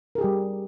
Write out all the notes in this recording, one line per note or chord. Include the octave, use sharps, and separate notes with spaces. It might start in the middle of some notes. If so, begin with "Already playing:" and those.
G3 G4 G#4 A#4